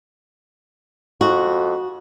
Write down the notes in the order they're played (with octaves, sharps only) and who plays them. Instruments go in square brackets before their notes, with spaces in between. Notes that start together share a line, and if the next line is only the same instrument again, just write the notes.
[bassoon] F2 [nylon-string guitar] F#4